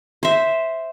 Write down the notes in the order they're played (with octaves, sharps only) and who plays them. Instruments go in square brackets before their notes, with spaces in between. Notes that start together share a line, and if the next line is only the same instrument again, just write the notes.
[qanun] C5 E5